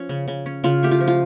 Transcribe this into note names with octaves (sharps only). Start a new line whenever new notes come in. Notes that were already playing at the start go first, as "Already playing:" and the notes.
Already playing: F3 C#4
C#3
C#3
C#4
C#3 F4
A3 G4
F4
F3
F4